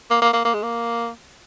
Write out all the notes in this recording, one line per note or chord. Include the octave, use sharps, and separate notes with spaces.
A#3
A#3
A#3
A#3
G#3
A#3